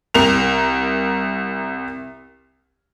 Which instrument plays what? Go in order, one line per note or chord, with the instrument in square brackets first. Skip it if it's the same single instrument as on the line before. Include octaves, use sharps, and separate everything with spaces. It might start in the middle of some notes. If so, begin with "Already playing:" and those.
[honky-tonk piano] C2 A#4 F7